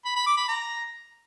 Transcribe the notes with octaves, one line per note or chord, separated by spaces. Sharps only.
B5
B5
D6
B5
A#5